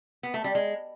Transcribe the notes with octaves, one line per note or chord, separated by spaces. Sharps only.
B3
A3
G3
G#3